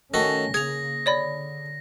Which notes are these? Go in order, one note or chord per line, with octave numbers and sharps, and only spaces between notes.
D#3 A3 C#4 F#4 A4 A#6
C#3 A#3 G#4 G#6 F7
D3 C#5 D5 B5